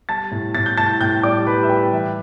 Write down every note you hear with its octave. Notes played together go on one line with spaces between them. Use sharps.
G3 A5 A6
A2
A2 A6
G6
A2 A5 A6
A2 G5 G6
G3 D5 D6
G3 B4 B5
E5
G3 G4 G5
E3 E5